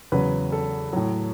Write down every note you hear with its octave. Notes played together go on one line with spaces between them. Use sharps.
E2 C#3 F#3 B4
A4
A2 F#3